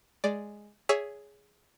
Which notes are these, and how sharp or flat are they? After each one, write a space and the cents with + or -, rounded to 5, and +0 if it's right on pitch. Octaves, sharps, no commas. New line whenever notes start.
G#3 +0 D5 +0
G#4 +0 C#5 +20 E5 +0